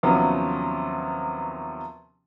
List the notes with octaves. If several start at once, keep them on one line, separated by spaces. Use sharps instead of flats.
D#2 C3 F3 F#3 B3 C#4